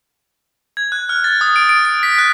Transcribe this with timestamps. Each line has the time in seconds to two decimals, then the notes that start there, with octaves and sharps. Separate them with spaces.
0.77 G#6
0.92 F#6
1.09 F6
1.24 A6
1.41 D#6
1.56 D7
1.69 D7
1.85 D7
2.03 B6
2.18 F#6